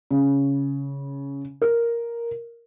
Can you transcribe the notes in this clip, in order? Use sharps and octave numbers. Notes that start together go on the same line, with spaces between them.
C#3
A#4